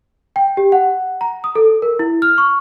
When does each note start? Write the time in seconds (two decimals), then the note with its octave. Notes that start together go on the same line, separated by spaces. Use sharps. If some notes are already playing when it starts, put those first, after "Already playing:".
0.36 G5
0.57 G4
0.72 F#5
1.21 A#5
1.44 D#6
1.55 A4
1.82 A#4
1.99 E4
2.22 F6
2.38 C#6